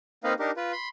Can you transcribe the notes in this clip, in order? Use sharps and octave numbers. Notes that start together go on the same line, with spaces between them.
A#3 C4 D#4 B4 D#5 F5
D4 D#4 G4 A#4
F4 B4
B5 C6